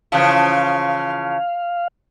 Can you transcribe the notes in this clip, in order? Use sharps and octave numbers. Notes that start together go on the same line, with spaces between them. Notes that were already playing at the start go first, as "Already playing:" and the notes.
C#3 E3 F3 F5